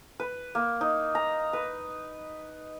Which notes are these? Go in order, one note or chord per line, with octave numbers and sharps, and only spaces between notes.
B4
A#3
D#4
A#5
B4